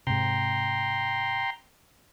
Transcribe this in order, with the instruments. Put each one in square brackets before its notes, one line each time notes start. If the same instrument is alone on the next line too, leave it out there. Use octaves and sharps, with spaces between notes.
[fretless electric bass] G#2 C3 [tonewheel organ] G5 A#5 C6